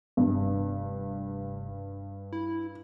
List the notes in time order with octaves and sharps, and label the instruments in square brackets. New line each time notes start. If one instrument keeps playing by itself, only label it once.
[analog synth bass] F1 [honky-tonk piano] G2
[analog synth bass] E4